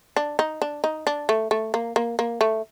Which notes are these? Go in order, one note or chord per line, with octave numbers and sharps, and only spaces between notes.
D4
D#4
D4
D#4
D4
A3
A3
A#3
A#3
A#3
A3